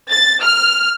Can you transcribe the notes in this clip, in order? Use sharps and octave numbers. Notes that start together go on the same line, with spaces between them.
A6
F6